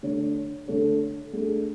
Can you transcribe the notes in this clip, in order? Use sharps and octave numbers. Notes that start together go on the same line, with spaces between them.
D3 A3 D4 A4 C#5
D3 A3 D4 A4 C#5
A3 D4 G#4